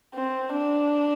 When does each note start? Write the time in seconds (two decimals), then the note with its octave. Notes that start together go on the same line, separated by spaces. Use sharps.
0.15 C4
0.53 D4